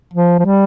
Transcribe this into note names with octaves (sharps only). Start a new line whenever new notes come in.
F3
F3
G3